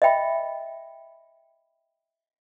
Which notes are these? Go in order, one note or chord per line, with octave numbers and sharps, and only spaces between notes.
D#5 E5 G5 B5